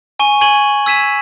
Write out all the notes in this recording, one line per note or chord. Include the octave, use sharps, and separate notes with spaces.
G#5 C#6 D#7
G#5 C#6 G#6 D#7 F#7
E6 G#6 B6 D#7 E7